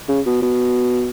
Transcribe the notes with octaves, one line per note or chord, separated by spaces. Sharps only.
C#3
B2
B2